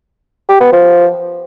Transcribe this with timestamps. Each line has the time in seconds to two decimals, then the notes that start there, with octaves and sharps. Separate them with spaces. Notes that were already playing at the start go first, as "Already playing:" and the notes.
0.49 G4
0.61 B3
0.72 F3